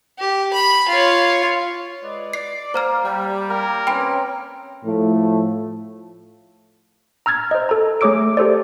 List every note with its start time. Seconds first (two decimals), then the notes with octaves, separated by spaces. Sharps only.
0.19 G4
0.53 B5
0.89 F4 C#5
2.02 G#3 B4 D5
2.34 D5 C7
2.74 A#3 C5 A#5 F6
3.03 G3
3.50 A#3 A#4
3.87 C4 C#4 B4 C#5 G5 A#5 B5 D7
4.84 A2 F3 A3
7.26 A#5 E6 F6 G#6 A6
7.51 C5 D#5
7.69 A4 A#5
8.01 A3 G#4 C#5 D6 E6 D7
8.37 G4 A4 C5 D5